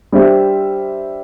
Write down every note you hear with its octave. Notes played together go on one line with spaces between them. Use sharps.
G3 D4 G4 C5 E5